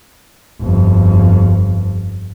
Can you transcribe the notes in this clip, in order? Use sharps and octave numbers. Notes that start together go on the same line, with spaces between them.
G1 F2